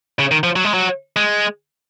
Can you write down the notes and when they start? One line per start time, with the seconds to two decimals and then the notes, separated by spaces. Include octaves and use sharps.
0.19 C#3
0.31 D#3
0.44 F3
0.56 F#3
0.65 G#3
0.74 F#3
1.16 G#3